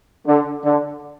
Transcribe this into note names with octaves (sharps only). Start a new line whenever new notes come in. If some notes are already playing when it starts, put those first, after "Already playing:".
D3
D3